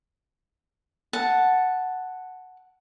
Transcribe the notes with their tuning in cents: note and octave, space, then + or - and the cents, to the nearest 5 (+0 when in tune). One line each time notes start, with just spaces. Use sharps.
F#5 +0 A5 +0